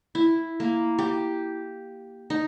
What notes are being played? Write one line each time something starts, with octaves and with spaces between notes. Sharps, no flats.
E4
A#3
G4
D#4